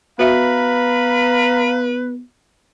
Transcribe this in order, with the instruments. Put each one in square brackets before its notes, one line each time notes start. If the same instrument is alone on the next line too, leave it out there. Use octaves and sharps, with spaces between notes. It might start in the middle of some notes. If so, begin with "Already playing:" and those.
[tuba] B3 [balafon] F#4 E5 [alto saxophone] B4 [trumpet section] F5 A#5 B5